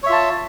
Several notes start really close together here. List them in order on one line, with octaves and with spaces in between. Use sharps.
C#5 E5 F4 A5